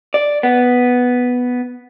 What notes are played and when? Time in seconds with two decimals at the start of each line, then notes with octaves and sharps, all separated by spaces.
0.14 D5
0.43 B3